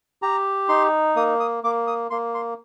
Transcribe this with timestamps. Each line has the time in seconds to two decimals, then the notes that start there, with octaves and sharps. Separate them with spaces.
0.22 G4 A#5
0.69 D#4 C6
1.16 A#3 D#6
1.40 D#6
1.64 A#3 D6
1.87 D#6
2.10 A#3 C6
2.34 C6